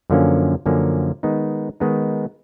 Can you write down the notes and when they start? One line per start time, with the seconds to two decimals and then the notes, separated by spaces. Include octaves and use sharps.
0.10 F#2 D3 F3 A#3 C#4
0.66 F#2 D3 F3 A#3 C#4
1.23 D#3 G#3 B3 D#4
1.80 D#3 G#3 B3 D#4